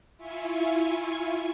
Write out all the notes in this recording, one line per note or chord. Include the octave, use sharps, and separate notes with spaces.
E4 F4 E5 G#5 C#6